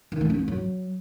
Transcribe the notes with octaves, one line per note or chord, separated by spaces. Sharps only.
D#3
A3
C#4
A#3
F#3